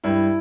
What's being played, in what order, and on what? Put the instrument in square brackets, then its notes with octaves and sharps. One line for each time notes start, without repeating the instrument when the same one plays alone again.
[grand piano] G2 E4